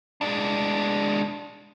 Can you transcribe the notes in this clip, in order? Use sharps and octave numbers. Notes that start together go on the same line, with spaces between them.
G#3 D4